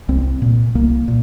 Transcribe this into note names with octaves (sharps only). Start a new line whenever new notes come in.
C2 C4
A#2
C2 A#3
A#2